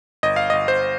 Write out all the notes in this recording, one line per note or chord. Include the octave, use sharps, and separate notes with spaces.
G1 D#5
F5
G1 D#5
C5